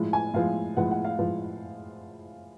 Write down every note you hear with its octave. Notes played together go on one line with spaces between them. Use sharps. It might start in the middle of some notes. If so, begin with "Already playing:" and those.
Already playing: A2 F3 G#3
G#5
A2 F3 G#3 F5
A2 F3 G#3 F#5
F#5
F5
A2 F3 G#3